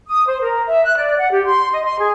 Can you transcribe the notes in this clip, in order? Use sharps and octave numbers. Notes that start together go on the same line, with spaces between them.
D#6
C5
A#4
E5
F#6
D5
F#5
G4
C6
D#5
C6
G#4